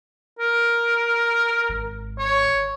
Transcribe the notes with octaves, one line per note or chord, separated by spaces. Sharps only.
A#4
G#1
C#5